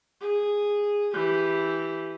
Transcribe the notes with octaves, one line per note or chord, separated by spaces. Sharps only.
G#4
E3 G4